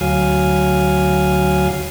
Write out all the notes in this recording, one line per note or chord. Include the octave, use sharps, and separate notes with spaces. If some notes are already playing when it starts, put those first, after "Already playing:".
D2 F#3 F5 G#5